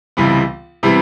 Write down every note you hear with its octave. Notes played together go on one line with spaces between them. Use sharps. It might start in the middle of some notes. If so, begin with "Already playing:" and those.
C#2 C3 E3 G3 B3
C3 E3 G3 B3